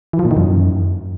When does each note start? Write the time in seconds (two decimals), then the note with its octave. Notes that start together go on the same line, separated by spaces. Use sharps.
0.13 E3
0.19 F3
0.25 A#2
0.31 D#3
0.37 F#2